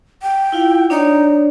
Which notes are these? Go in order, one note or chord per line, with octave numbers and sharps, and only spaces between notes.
G5
E4 F4 F5
D4 D#4 C#5 D5